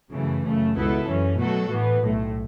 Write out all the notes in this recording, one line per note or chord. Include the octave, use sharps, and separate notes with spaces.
F#2 C#3 E3 A3
F#2 C#3 A3
C#2 B2 B3 E4 A4
F#2 E3 C#4
B2 F#3 A3 F#4 A4
A2 E3 B3
B1 A2 A3